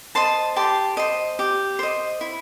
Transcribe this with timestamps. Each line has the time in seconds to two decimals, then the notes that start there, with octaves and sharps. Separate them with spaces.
0.15 C5 D#5 A5 C6
0.56 G4 A5 C6
0.97 C5 D#5
1.39 G4
1.79 C5 D#5
2.21 E4